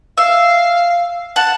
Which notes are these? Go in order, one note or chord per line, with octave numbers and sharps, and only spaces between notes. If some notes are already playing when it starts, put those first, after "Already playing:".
E5 F5 E6
F#5 A5